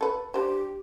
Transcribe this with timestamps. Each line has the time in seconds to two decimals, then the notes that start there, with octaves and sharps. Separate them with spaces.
0.01 A4 B4
0.34 D4 G4 C5